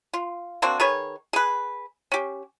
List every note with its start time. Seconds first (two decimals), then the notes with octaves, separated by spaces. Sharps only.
0.13 F4
0.62 A#3 C4 D4 F#4
0.80 D#3 G#4 B4 C#5
1.33 G#4 B4
2.12 C#4 G4